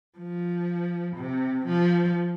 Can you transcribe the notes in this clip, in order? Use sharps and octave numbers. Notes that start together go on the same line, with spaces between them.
F3
C3
F3